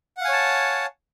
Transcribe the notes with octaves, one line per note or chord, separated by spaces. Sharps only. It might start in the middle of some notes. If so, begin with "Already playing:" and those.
C#5 F5 F#5 G#5 A5